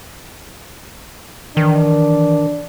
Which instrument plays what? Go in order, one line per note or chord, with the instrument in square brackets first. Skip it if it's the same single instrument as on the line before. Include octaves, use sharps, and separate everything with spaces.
[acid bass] D#3 [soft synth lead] E3 [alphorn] D4